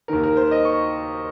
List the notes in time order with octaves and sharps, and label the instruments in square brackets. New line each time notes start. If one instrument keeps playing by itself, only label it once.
[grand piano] D#2 D#3 A#4
A#4
C5
D#5
C#6